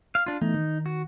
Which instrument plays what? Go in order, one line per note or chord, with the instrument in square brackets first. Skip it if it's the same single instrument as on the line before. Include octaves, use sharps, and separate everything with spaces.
[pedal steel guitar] F5
D4 F4
[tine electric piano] E3 A3 B3 [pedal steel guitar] D#4
[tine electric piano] D#3
[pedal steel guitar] F#4